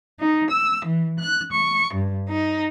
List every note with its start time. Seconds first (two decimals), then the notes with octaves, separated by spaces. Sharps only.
0.19 D#4
0.50 E6
0.84 E3
1.18 F#6
1.52 C#6
1.94 G2
2.29 D#4